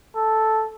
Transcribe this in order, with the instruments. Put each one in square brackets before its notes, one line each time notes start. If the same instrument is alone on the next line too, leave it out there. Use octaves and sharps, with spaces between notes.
[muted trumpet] A4